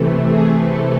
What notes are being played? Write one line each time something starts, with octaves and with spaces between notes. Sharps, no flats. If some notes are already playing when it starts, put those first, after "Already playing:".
Already playing: C3 E3 A3
G#4
A4